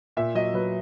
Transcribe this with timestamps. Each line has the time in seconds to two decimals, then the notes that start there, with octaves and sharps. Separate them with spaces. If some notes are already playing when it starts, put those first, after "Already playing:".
0.17 A#2 E5
0.35 F#3 D#5
0.54 F#3 B4